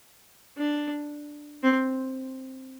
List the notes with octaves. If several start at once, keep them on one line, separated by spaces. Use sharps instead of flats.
D4
C4